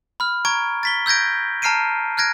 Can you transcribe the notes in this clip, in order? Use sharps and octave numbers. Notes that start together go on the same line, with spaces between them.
B5 F6
A#5 C#6 G#6 D7
A6 B6 G7
E6 G6 G#6 A#6 D7
A5 A#5 F6 C7 D7 D#7
F6 F#6 G#6 A#6 D7